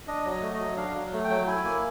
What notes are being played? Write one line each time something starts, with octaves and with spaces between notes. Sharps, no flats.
D4 D#5
F#3
D#5
A3
D#5
F#3
D4 F5
F#3
A3
G5
F#3
E4 G#5
A#3